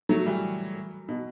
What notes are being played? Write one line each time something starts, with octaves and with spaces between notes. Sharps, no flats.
F#3 A3
E3 G3
B2